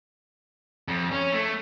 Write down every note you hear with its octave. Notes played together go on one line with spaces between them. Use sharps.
F2
C#4
A3